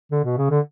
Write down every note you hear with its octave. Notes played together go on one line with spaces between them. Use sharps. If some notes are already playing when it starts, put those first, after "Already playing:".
D3
B2
C#3
D3